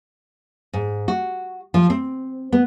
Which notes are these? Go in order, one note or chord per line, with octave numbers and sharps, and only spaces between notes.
G#2
F#4
F3
C4
B3